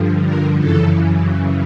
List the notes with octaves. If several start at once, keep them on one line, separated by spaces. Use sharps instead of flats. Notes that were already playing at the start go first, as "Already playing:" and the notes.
Already playing: G2 D3 F3
A#4
F#2 C#3 E3 A4